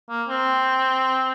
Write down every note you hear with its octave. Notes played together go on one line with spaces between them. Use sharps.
A#3
C4